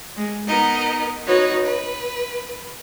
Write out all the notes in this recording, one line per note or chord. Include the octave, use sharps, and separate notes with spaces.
G#3
B3 D#4 A#4 D#5
D#4 F#4 B4 C#5
B4